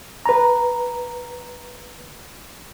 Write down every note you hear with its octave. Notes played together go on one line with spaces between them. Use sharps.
B4 A#5